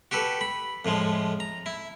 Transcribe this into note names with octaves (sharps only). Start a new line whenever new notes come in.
F#4 G4 A4 B4
B5
F2 A2 F3 G#3
A#5
E4